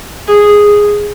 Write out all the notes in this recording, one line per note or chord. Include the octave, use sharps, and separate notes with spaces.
G#4